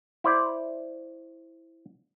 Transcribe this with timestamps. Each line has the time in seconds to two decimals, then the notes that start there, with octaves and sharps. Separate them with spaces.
0.24 E4 C5 D5